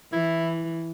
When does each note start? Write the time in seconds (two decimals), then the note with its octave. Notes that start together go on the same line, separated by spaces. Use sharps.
0.12 E3 E4